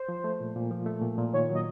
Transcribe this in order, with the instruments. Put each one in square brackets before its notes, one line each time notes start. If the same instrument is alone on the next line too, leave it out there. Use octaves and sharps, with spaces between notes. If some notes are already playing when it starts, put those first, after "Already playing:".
Already playing: [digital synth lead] C5
[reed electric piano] F3
A3
A#2
A#2
F3
A3
A#2
A#2
[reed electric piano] D#3 [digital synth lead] C#5
[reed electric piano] F#3 [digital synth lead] D#5